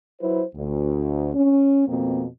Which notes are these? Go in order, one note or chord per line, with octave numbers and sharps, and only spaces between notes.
F#3 E4 B4 C5
D2
C#4
F2 B2 A#3 C4